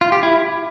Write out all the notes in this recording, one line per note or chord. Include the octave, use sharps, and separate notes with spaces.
F4
G4
E4